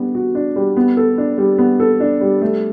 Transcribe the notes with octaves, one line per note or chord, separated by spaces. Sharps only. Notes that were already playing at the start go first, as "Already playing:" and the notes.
Already playing: G3 B3 D4
F#4
D4
G3
B3
A4
D4
G3
B3
A4
D4
G3
A3